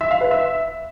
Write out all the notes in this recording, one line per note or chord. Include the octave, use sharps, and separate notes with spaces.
E5
F5
B4
E5